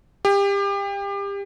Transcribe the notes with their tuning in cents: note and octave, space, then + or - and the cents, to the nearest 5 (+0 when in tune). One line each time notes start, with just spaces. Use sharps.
G4 +30